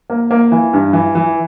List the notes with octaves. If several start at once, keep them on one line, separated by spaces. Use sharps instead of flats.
A#3
A#3
E3
G2
E3
E3